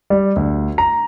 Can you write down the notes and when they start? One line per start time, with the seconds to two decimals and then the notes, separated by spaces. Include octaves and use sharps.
0.10 G3
0.36 D2
0.78 A#5